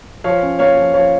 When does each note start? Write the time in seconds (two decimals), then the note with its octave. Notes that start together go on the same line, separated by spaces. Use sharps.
0.24 F3 C#5 F5
0.42 C#4
0.59 A#3 C#5 F5
0.77 F3
0.94 F3 C#5 F5